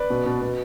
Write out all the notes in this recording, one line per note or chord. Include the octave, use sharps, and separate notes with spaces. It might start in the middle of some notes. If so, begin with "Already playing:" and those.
Already playing: B4 D5
B2
B2
B2